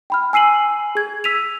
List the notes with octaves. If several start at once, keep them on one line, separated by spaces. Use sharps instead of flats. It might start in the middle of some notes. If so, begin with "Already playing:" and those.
G5 B5 F6
G#5 E6 C7 D#7 F#7
G#4 G#6
E6 B6 D#7 F7